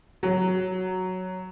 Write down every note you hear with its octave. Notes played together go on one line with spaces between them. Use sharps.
F#3